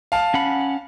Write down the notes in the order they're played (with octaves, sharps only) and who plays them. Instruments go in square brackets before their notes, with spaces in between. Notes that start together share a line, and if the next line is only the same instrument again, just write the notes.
[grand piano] F5 A5
[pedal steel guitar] C#4 F#5 B5